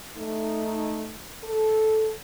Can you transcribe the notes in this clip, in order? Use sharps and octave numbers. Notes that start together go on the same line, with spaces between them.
A3 D#4
A4